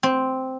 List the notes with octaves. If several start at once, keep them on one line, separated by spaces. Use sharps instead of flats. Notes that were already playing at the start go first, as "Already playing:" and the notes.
C4